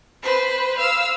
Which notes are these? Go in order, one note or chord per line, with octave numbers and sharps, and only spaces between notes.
B4 C5
F5 E6